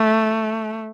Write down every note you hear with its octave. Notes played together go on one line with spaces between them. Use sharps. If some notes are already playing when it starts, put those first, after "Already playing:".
Already playing: A3